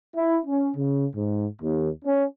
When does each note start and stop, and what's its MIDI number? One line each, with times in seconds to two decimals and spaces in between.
0.15 0.38 64
0.45 0.71 61
0.76 1.05 49
1.15 1.45 44
1.60 1.89 39
2.04 2.24 61